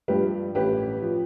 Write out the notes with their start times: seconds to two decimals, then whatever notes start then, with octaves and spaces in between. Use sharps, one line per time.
0.08 G2 F3 G4 B4
0.55 A1 G4 B4
1.02 F3